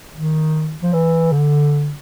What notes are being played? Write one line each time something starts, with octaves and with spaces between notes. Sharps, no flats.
D#3
F3
E3
D3